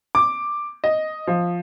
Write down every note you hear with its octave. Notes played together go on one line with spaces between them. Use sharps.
D6
D#5
F3